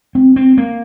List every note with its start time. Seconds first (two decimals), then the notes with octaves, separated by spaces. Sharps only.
0.15 C4
0.36 C4
0.58 A#3